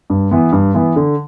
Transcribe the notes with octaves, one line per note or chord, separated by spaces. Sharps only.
G2
E3 B3
G2
E3 B3
D3